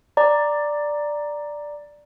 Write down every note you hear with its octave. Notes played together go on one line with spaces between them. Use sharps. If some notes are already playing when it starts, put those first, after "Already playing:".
D5 A#5